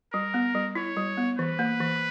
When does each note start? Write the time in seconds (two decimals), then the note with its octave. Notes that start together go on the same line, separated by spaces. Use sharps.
0.13 G3 A#4
0.34 B3
0.55 G3
0.75 E4 C#5
0.96 G3
1.17 B3
1.39 E3 B4
1.59 A#3
1.81 E3